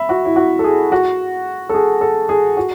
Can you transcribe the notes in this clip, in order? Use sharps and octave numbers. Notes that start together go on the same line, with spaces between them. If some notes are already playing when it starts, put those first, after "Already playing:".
Already playing: E5 B5
F#4
E4
F#4
A4
G#4
F#4
A4
G#4
A4
G#4
F#4